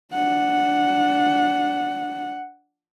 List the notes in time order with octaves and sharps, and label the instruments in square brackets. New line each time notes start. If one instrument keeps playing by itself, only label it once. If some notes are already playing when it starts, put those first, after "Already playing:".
[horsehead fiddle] D4 F#5